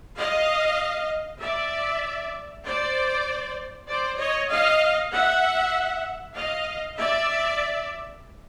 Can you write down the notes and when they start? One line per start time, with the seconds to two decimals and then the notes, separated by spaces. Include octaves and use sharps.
0.18 D#5 F5
1.41 D5 E5
2.65 C5 D5
3.88 C5 D5
4.18 C#5 D#5
4.49 D#5 F5
5.12 E5 F#5
6.34 D#5 F5
6.97 D5 E5